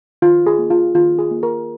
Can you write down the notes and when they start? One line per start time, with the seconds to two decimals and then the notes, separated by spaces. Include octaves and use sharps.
0.22 D#3 F4
0.46 G#4
0.58 A#3
0.70 F4
0.95 D#3 F4
1.19 G#4
1.31 A#3
1.43 A#4